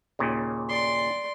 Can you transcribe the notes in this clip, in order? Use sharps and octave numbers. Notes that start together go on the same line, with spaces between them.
D#2 A#2 C#3
D5 C6